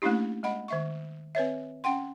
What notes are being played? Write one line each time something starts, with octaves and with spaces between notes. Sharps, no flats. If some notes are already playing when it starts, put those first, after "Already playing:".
A3 A#3 C#4 D4 E4 G4
G#3 D#5 F#5 B5
D#3 E5 C#6
C4 B4 C#5 E5
C#4 F#5 G5 C6